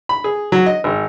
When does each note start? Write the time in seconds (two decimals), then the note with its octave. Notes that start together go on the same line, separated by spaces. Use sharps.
0.09 B5
0.24 G#4
0.52 F#3
0.66 D#5
0.84 G#1